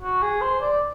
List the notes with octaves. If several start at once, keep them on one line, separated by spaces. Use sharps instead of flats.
F#4
G#4
C5
D5